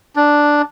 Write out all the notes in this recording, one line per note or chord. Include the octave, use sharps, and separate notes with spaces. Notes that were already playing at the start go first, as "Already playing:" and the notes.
D4